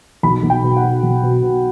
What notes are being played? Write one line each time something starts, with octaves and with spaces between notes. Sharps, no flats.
B1 B5
B1
G5
B2
F#5
B2
B1
B2
B2